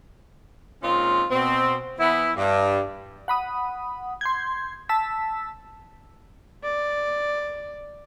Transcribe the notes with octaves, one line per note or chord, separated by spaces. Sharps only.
A#2 G#3 C4 C#4 D#4 F4
B2 C4
E3 B3 E4
G2
F#5 B5 D#6
C6 G6 G#6
A5 E6 B6
D5